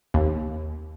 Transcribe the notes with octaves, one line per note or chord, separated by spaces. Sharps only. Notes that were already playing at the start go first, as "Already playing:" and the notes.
D#2